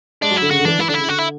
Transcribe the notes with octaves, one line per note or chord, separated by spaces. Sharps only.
G#3 D4
F#3
E4
D3
C#3 F#4
D3
E3 D4
E3 E4
D3 D4
C#3 E4
D3 F#4
E4